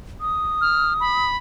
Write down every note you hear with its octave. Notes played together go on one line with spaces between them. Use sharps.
D#6
F6
B5